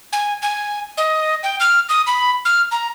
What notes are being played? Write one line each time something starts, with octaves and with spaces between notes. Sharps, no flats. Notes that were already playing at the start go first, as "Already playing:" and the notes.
G#5
G#5
D#5
G5
F6
D#6
B5
F6
A#5